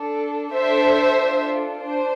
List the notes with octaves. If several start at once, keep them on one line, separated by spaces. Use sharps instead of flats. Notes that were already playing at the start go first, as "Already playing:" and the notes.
Already playing: D4 A4
D4 A4 C5 E5
D4 F4 A4
D4 C5